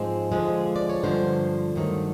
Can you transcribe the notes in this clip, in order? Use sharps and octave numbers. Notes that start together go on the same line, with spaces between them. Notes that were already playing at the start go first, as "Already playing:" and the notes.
Already playing: G#2 F3 G#3 C4
D3 F3 G#3
D5
C#5
G2 D3 F3 C5
G2 D#3 F#3 A3